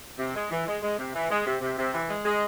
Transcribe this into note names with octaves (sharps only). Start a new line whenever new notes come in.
C3
G#3
E3
G#3
G#3
C3
E3
G#3
C3
C3
C3
E3
G#3
G#3